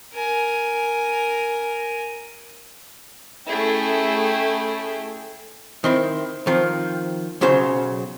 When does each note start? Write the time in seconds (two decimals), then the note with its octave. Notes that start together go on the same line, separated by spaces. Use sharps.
0.14 A#4 G#5
3.47 A3 C#4 E4 G#4 G5
5.84 D#3 C4 E4
6.47 D#3 F3 C4
7.41 B1 C#3 F#3 C5